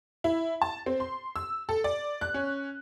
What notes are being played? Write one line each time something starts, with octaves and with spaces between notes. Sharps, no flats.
E4
A5
C4
C6
E6
A4
D5
F#6
C#4